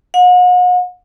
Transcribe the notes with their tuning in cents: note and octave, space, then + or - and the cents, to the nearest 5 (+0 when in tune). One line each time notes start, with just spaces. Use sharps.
F#5 -40